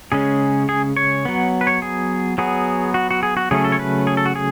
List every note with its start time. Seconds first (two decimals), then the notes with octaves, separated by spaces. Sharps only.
0.12 C#3 G#3 C#4 G#4
0.69 G#4
0.97 C#5
1.25 F#3 B3
1.61 B4
1.67 C#5
1.82 G#4
2.38 F#3 B3 G#4
2.94 F#4
3.11 F#4
3.23 G#4
3.37 F#4
3.51 C#3 F#3 A3 C#4 G#4
3.64 A4
3.72 C#5
3.79 B4
4.07 G#4
4.17 A4
4.26 F#4
4.36 G#4